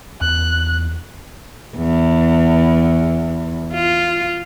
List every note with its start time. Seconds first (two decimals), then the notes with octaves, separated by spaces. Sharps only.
0.21 E2 F#6
1.76 E2
3.73 F4